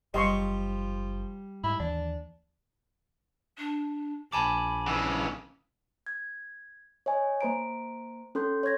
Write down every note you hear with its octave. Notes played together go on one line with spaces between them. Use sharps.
F#1 F3 G3 D#5 C6 C#6
G#2 E4
D#2 E3 D4
D4
A#1 G#5 A5 B5 D6
C#3 E3
G#6
C#5 D#5 G#5
A#3 C5 A#5 D7
C#4 A4 C6 G6
C#5 C6 G#6 A#6